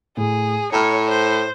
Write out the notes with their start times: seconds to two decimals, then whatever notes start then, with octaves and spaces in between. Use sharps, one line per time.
0.17 A2 G#4
0.72 A2 C#5 A#5 B5 F6
1.10 C5